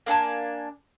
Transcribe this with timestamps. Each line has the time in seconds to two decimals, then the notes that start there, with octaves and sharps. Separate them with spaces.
0.06 A#3 D4 G#5 A5